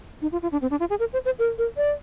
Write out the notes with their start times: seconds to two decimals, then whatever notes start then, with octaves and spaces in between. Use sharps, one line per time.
0.22 D#4
0.32 F4
0.42 F4
0.52 D4
0.62 C4
0.71 D4
0.80 F4
0.90 G#4
1.00 A#4
1.13 C5
1.25 C5
1.39 A#4
1.58 A#4
1.77 D5